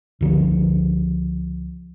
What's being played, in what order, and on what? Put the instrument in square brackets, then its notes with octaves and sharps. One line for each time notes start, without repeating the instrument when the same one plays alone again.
[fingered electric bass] C#2 D3 F3